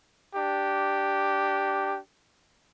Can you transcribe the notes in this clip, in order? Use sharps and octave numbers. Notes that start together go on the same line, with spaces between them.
D4 G4